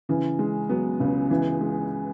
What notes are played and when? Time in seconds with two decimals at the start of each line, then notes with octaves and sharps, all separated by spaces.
0.09 C#3 E3
0.39 G#3
0.69 F#3 B3
1.00 C#2 C#3
1.31 C#3 E3
1.61 G#3